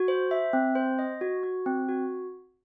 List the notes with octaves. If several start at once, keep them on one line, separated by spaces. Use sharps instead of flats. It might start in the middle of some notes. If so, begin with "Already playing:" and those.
Already playing: F#4
C5
E5
C4
C5
D#5
F#4
F#4
C4
F#4